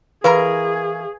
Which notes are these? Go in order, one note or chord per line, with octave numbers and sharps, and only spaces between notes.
E3 G#4 A#4 B4 F5 A#5 C#6